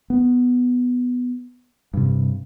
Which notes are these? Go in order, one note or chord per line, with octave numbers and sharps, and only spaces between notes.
B3
G2 C3